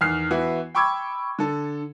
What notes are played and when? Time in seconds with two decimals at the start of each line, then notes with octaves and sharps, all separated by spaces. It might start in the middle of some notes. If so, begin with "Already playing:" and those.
0.01 E2 D#3 F6 C7
0.31 E3 B3 E4 F#4
0.75 G5 B5 C#6 D6 E6 G#6
1.39 D3 A4